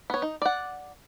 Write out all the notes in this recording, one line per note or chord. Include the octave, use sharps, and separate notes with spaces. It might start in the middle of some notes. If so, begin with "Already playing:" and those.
B3 C#5
D#4
D5 F#5